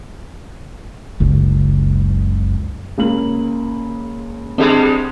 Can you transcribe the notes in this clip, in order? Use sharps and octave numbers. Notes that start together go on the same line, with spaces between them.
F#1 C#2
C#2 A#3 F#7
D3 G3 G#3 C4